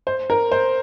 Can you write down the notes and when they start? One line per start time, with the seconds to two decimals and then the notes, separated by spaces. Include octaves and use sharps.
0.07 C5
0.30 A#4
0.52 C5